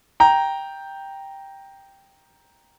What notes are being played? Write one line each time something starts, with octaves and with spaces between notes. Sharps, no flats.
G5 A#5